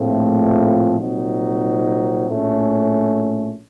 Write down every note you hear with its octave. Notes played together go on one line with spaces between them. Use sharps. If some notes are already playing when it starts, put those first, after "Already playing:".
Already playing: A#1 A2 F3 A3 C4
C2 A#2 F#3 C4 D#4
A#1 A2 A3 C#4